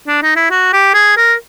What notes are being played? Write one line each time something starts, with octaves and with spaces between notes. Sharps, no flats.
D4
D#4
E4
F#4
G4
G#4
A#4